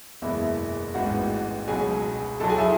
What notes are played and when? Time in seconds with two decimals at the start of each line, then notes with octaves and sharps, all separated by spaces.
0.22 F#1 E2 B2 G#3 B3 E4 E5
0.94 A1 G#2 E3 G#3 B3 F#4 F#5
1.67 C#2 B2 F#3 G#4 G#5
2.40 B1 B2 F#3 A4 A5
2.49 G#4 G#5
2.58 E4 E5